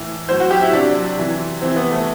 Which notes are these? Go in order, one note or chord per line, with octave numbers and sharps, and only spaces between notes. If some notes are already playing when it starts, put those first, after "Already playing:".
Already playing: A2 E3
A2 F#3 C5
F#4
G4
E4
C3 F#3 D4
C3 E3
C3 E3 C4
B3
A3